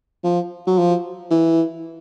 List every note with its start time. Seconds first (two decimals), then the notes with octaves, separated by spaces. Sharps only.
0.24 F3
0.67 F#3
0.79 F3
1.31 E3